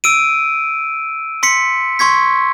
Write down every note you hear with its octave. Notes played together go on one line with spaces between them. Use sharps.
E6 D7 D#7
C6 B6 C#7
C6 C#6 G#6 B6